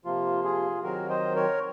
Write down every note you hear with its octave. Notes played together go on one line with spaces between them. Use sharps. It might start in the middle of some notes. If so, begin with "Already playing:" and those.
C3 F3 A#3 F4
F4 G#4
D#3 F#3 C4 F#4 A#4
C5 D#5
A#4 C#5